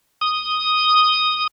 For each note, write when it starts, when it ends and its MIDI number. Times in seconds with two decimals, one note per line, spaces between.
0.21 1.47 87